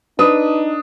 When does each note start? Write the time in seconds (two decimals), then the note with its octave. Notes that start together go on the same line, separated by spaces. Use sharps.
0.19 D4 D#4 B4 D#6